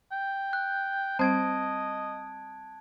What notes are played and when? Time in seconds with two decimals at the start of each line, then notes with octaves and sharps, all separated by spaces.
0.12 G5
0.53 F#6
1.19 G3 C4 C5 D#5 A5 G#6 D7